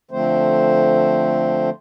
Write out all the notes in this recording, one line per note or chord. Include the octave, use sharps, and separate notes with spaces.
D3 F3 A3 C4 C5